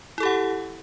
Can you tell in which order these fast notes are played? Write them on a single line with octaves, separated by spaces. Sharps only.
E4 A4 G4 F#5